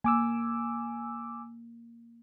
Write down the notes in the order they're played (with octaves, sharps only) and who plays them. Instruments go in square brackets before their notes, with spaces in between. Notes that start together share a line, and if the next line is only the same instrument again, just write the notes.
[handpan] A#3 [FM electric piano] G#5 D6 E6